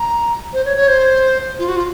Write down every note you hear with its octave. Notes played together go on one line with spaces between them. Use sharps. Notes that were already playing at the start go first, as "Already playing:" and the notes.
Already playing: A#5
C5
C#5
C#5
C5
F4
F#4
F4